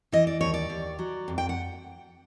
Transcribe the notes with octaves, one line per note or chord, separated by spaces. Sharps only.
E3 D#5
D5
D#2 C#5
D5
D#2
F#3
F2
G5
F#5